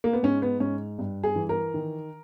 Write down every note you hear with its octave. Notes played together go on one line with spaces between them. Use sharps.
A#3
B3
G#2 C#4
B3
G#2 C#4
G2
G#4
E3
A#4
D#3